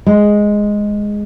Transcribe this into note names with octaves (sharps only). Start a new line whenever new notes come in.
G#3